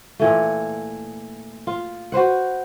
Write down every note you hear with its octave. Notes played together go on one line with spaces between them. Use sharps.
A#2 E3 A3
F4
F#4 B4 C5 F#5